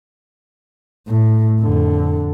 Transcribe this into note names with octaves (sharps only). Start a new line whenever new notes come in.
A2
F2 D3